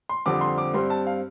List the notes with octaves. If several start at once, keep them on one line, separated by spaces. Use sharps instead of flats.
C6
F2 D3 G3 C4 D6
C6
D6
G2 G3 C4 C6
A5
F5